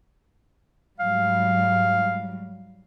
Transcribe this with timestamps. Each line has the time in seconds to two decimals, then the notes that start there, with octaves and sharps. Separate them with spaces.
1.00 G#2 F#3 G3 F5